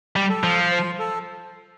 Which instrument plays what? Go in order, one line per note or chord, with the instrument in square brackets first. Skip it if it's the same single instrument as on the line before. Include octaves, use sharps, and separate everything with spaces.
[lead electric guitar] G3
[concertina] A4
[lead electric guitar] F3
[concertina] C5
A4